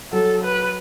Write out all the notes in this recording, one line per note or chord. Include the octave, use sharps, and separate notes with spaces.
F#3 A4
B4